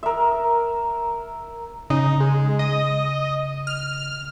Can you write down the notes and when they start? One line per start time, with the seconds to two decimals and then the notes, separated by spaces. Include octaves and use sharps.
0.03 A#4 E5
1.90 C#3 D#4
2.20 G#3
2.59 D#5
3.67 F6